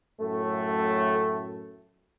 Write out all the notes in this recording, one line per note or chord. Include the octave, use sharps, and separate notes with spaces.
F#2 A2 A3